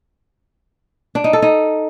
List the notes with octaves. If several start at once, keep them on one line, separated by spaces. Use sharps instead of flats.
D4
D#4
A4
D#4